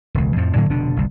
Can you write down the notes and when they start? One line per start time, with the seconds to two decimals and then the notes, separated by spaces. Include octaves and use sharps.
0.15 E1 C#2
0.36 F2 A2 F3
0.56 A2 D3 F#3 A#3
0.69 F1 B2 D3 D4
0.96 G1 C2